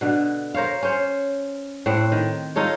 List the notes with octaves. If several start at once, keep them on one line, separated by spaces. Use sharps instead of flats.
B2 D3
A#4 C5 C#5 F5
C#4 C5 C#5
A2 C4 F#5
D#3
D#4 F4 A4 C#5